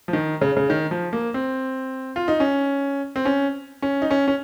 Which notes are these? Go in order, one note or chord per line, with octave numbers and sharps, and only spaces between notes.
F3
D#3
C#3
C#3
D#3
F3
A#3
C4
F4
D#4
C#4
C4
C#4
C#4
D#4
C#4
C#4